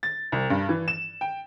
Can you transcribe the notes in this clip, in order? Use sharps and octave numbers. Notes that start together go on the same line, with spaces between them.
A6
C2
G2
E3
E7
G5